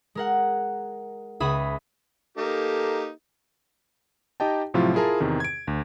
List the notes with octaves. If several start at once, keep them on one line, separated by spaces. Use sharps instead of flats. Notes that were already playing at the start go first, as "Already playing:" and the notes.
G#3 A#4 F#5
C#2 G#4 E5 B5 D#6
A#3 D#4 G4 A4
D#4 G4 D#5 G5 A5
A2 C3 F3 F#3 E4 F4
E4 F4 G#4 A#4 A5
E2 C3 D#3
G#6 D7
D2